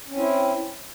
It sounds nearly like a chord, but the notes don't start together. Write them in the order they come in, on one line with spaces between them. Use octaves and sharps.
C#4 C4 E4